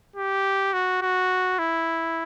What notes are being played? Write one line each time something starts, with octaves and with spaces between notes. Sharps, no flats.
G4
F#4
F#4
E4